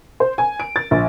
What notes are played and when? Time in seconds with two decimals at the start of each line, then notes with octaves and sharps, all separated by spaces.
0.20 C5
0.38 G#5
0.60 D7
0.76 A6
0.91 A#1